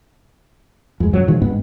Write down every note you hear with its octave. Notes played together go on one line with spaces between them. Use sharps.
F2 G#3
F#2 F#3
B2 D#3 F3 G#3
G#1 G2 G#3 B3